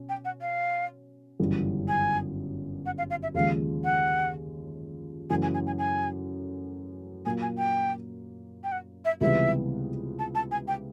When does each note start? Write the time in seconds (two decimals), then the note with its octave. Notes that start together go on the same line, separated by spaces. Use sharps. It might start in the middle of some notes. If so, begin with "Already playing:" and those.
Already playing: B2 C#4
0.09 G5
0.25 F#5
0.41 F5
1.39 G1 F#2 C#3 E3 G3
1.88 G#5
2.86 F#5
2.98 F5
3.10 F5
3.23 E5
3.34 D#2 C#3 F3 G#3 F5
3.84 F#5
5.30 F#2 C#3 E3 A3 G#5
5.42 G#5
5.54 G#5
5.67 G#5
5.78 G#5
7.25 A#2 F#3 A#3 G#5
7.42 G#5
7.58 G5
8.64 G5
8.72 F#5
9.05 E5
9.21 C#2 C3 E3 G3 B3 E5
10.19 A5
10.35 A5
10.51 G#5
10.68 G5